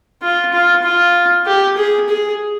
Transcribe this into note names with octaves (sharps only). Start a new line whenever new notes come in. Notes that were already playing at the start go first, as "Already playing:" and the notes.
F4
F4
F4
G4
G#4
G#4